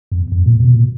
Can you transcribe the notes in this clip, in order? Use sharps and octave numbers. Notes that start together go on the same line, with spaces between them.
F2
E2
F2
A#2
B2
A#2